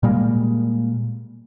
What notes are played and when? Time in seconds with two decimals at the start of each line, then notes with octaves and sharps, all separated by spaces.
0.03 A#2 G3 G#3 A#3